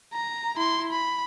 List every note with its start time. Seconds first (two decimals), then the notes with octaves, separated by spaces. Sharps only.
0.13 A#5
0.56 E4 C6
0.92 B5